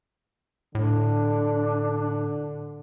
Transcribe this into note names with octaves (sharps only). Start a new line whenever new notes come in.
A2 D3 D4